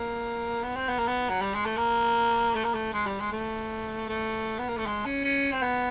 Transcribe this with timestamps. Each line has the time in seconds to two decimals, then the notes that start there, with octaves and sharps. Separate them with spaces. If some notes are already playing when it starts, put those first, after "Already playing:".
Already playing: A#3
0.63 B3
0.76 C4
0.89 B3
0.98 A#3
1.08 B3
1.29 F#3
1.42 G3
1.54 G#3
1.66 A3
1.78 A#3
2.55 A3
2.65 A#3
2.74 A3
2.94 G#3
3.06 G3
3.20 G#3
3.32 A3
4.09 A3
4.59 B3
4.69 A#3
4.78 A3
4.86 G#3
5.05 C#4
5.25 C#4
5.52 C4
5.63 B3